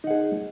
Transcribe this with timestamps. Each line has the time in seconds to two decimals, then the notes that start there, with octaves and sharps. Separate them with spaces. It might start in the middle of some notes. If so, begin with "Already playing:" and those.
0.04 D#4
0.07 F#5
0.10 G#4